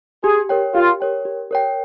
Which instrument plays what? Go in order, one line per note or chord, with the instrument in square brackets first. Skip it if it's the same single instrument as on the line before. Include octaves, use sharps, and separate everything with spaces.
[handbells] G4 [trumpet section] G#4
[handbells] A#4 C#5 G5
[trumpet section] F4 [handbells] G4
[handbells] A#4 C#5 G5
G4
A#4 C#5 G5